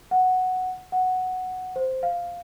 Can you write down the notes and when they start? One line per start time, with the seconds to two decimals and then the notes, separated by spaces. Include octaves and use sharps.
0.11 F#5
0.92 F#5
1.76 C5
2.03 F5